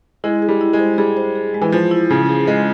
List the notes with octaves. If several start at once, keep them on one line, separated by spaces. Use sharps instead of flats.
G#3 E4
G#4
G3
E4
G#3
C5
G3 G#4
C5
G#4
G#3
E3
F3 C5
E4
C#3 G#4
G#4
G#3 G#4